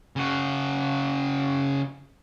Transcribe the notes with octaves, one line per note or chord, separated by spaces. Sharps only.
C#3 F#4